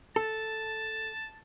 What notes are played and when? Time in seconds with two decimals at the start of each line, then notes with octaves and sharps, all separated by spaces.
0.16 A4 A5